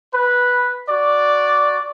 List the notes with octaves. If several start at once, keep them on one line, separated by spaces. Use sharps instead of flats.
B4
F#4 D5